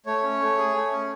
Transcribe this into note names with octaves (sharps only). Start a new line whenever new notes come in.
A3 C#5
C#4
A3
G#4
A3
C#4